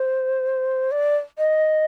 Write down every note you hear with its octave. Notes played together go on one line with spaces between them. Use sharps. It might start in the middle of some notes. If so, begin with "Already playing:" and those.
Already playing: C5
D5
D#5